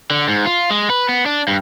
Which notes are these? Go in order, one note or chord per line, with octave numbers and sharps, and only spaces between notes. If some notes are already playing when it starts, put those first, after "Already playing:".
D3
G#2
F4
G#3
B4
B3
D4
G2